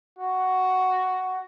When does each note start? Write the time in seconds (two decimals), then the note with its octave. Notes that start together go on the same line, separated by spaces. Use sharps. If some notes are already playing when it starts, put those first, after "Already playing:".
0.19 F#4